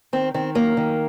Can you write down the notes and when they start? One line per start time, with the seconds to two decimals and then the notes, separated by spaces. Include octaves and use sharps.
0.13 D#3 C4
0.34 D#3 C4
0.55 F#2 A#3
0.77 D#3